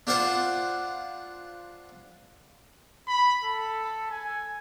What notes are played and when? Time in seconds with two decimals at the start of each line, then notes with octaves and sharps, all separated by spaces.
0.07 D4 F4 C5 F#5
3.08 B5
3.44 A4
4.10 G#5